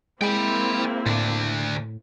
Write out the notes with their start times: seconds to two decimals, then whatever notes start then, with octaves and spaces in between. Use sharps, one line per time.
0.21 G#3 A#3 C4 E4 G5 B5
1.06 D2 A2 D4